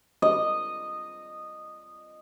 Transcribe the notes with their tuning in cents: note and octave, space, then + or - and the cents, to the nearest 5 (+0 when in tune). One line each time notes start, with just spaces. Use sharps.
D#5 -10